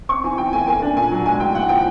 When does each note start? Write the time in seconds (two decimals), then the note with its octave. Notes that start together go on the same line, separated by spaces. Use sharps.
0.09 C4 C#6
0.24 E3 G#5
0.38 E3 G5
0.53 A3 G#5
0.67 A#3 G#5
0.82 D4
0.96 A#2 G#5
1.11 F#3
1.26 G#3 G#5
1.40 A2 G5
1.55 A2 F#5
1.69 F3 G5